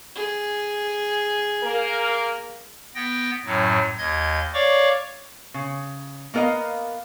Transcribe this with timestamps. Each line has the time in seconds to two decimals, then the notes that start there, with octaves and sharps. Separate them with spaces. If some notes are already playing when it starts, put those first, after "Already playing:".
0.15 G#4
1.63 A#3 A#4
2.95 B3 G5 A#6
3.45 F#2 A2 F#3
3.98 D#2 D#5 G#6
4.54 C#5 D5 F5 C#6 D6
5.54 C#3
6.34 A#3 B3 A#4 D#5 F5